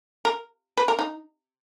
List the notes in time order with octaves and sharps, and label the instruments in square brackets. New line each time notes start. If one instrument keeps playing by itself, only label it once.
[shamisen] A#4
B4
A#4
D#4